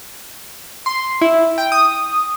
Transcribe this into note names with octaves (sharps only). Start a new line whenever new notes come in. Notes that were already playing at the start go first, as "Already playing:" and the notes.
C6
E4
G5
D#6